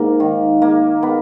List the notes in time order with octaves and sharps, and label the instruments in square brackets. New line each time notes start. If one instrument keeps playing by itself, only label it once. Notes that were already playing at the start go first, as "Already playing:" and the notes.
Already playing: [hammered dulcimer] G#2 A#3
D#3
A#3
B3